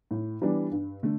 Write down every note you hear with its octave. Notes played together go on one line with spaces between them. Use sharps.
A2
E3 G3 B3 D4
G2
D3 A3